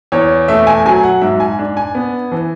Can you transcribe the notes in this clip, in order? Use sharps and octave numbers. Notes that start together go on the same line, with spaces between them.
E2 C#5
A3 E5
G#5
F#3 G#5
F#5
G#2 E5
G#5
D4
G#5
B3
E3